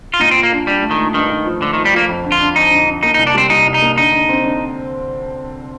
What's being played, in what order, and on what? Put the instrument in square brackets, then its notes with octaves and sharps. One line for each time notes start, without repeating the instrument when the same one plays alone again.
[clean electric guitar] F4
[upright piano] A#2 [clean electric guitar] D#4
[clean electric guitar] C4
[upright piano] F4
[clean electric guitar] A#3
[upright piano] D4
[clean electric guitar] G3 [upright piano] D4
[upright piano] A3
[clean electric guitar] D#3
[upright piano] A3
[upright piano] G2 [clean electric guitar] D#3
[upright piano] G2
F3
[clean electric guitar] D3 [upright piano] A3
[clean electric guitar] D#3
[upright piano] F3
[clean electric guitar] G3
[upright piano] F3 [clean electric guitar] A#3
[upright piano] F2
D3
[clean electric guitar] F4
[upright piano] D4
[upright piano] F2 [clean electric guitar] D#4
[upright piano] D3
D3
[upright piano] A#3 [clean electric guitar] D#4
[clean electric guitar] D#4
[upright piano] C2
[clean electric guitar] D4
[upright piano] G3 [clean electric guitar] C4
[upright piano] C2 [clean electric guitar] D#4
[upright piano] C2
[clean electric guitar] D#4
[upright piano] A#3
[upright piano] D3 [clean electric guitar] D#4
[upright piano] D3
C4
D3